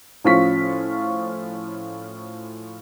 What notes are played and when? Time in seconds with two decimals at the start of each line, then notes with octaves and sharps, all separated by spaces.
0.25 A2 F3 C#4 F4 C#6 B6